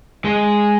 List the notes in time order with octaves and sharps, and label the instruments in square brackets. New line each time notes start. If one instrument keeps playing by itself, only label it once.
[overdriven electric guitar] G#3